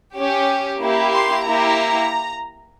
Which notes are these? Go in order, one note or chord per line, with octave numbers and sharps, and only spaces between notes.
C#4 G4
A#3 E4 G4
C6
A#3 E4 G4 A#5